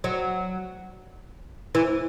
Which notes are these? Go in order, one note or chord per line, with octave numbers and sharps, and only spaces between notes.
F#3
E3